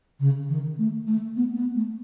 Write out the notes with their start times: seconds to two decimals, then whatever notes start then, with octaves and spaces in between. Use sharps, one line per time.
0.20 C#3
0.49 D#3
0.79 A3
1.07 A3
1.37 B3
1.56 B3
1.75 A3